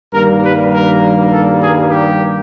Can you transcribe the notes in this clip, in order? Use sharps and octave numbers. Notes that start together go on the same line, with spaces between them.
G2 D#3 G3 A#3 A#4
B4
A#4
A4
G#4
G4